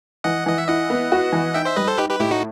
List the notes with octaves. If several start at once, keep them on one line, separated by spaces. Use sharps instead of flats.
E3 D#5 F#5
E3 D#5
E5
E4 D#5 F#5
B3
F#4
E3
D#4 E5 G5
C5 E5
G3 B4 D#5
A4 C5
D#4 G4 B4
G4 B4
A2 E4 G4
D#4 F#4